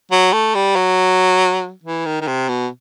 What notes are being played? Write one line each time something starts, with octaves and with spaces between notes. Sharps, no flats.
F#3
A3
G3
F#3
E3
D#3
D#3
C3
B2